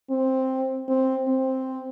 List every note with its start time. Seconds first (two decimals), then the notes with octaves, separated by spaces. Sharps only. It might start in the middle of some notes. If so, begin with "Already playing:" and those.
0.10 C4
0.89 C4
1.28 C4